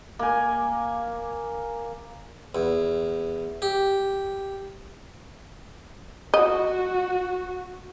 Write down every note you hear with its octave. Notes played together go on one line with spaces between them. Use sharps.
A#3 G#5
E2
G4
F#4 D#5